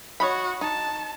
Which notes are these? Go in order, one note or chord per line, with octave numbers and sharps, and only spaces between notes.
F#4 C#5 D#5 B5
D#4 A5